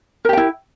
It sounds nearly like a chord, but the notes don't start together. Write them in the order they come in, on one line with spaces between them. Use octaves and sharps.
A#4 G4 G5 E4